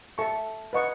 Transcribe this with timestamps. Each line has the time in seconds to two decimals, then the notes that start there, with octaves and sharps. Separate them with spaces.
0.18 A4 E5 A5 C#6
0.73 B4 D#5 F#5 C#6